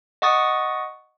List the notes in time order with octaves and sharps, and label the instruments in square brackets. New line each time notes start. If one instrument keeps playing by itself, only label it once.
[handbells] D#5 F#5 C#6 D#6 A6